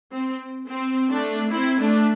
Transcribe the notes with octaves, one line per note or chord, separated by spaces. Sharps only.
C4
C4
A3 D4
C4 E4
A3 D4